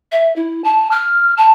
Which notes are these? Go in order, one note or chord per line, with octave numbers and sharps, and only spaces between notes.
E5
E4
A5
F6
A5